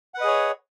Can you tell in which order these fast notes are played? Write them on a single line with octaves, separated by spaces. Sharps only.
F#5 B4 D#5 G#4 C#5